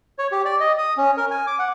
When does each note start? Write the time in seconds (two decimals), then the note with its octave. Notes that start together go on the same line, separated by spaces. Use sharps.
0.18 C#5
0.32 G4
0.45 D5
0.60 D#5
0.78 D#6
0.97 C#4
1.17 A#4
1.31 G#5
1.47 D6
1.59 F#5